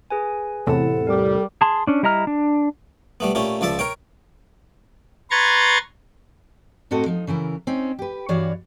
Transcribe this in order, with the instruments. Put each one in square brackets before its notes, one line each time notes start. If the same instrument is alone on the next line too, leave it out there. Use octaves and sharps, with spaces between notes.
[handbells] G#4 B4 G#5
[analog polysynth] E2 A2 C3 [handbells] E4 F#5 A5 [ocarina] A4
[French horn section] G3 [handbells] A#4 D6
[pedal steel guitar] G#4 A5 C6
C#4 D4
G3 E4 D#5 A#5 F6
D4
[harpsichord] G3 A3 B3
A#2 A3 C#4 G4
C#2 F3 D5 E5 A5
A#4 C#5 G5
[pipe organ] B4 A#5 C6 C#6 G#6 A6
[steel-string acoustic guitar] A2 C4 F#4 A4 D#5
F3 D#4
C#3 E3 E4 A#4
C4 C#4 D#4
G4 B4
G2 E3 F#4 C#5 D5 F5